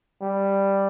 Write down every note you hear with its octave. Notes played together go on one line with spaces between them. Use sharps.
G3